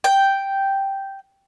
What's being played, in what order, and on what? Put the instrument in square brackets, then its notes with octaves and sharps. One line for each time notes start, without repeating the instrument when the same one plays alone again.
[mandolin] G5